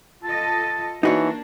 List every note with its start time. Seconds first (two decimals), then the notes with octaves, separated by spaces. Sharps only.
0.24 F4 A4 D#5 A5
1.03 E3 A#3 D4 D#4 F#4 C#5